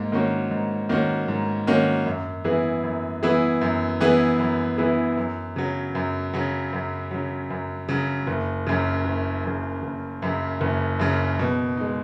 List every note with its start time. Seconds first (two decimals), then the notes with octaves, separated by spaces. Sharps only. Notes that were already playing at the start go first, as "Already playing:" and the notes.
Already playing: G#2 A#3
0.12 D#3 A#3 C#4 F#4
0.51 G#2
0.89 D#3 A#3 C#4 F#4
1.28 G#2
1.67 D#3 A#3 C#4 F#4
2.06 F#2
2.44 E3 B3 E4 G#4
2.84 F#2
3.23 E3 B3 E4 G#4
3.61 F#2
4.01 E3 B3 E4 G#4
4.39 F#2
4.78 E3 B3 E4 G#4
5.17 F#2
5.56 C#3 F#3
5.95 F#2
6.34 C#3 F#3
6.73 F#2
7.11 C#3 F#3
7.50 F#2
7.89 C#3 F#3
8.27 F#1
8.67 F#2 C#3
9.05 F#1
9.44 F#2 C#3
9.83 F#1
10.22 F#2 C#3
10.61 F#1
10.99 F#2 C#3
11.39 B2
11.77 G#3 D#4